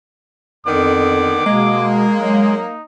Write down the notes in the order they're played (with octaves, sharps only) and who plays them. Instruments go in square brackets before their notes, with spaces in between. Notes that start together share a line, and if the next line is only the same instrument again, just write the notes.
[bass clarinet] F2 [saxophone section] D3 D#3 B3 [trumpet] D6
[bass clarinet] B2 [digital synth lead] G#3 [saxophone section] A#3
[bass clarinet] F#3 [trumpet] D#4